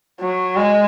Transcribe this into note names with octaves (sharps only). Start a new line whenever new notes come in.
F#3
G#3